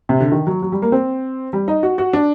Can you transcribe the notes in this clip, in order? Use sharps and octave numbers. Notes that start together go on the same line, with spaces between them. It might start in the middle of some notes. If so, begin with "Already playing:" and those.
C3
D3
D#3
F#3
F#3
G3
A#3
C4
G3
D#4
F#4
F#4
D4